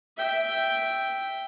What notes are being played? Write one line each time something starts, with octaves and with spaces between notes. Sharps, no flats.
E5 G5